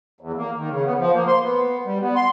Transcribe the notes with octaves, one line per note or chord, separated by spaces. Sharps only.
E2
A#3
D#3
C#3
B3
F3
A#3
C6
B3
G3
B3
C6